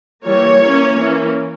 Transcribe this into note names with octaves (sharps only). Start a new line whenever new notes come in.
E3 G3 A#3 C#5
E3 A#3 C#4
E3 A#3 C#4